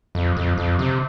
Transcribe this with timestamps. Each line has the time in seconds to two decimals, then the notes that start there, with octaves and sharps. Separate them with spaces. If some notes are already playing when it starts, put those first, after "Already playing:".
0.15 F2
0.37 F2
0.58 F2
0.79 C3